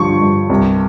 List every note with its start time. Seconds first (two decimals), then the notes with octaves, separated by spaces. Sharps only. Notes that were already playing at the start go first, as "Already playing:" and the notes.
Already playing: G2 D3 F3 C#6
0.21 G2
0.49 C2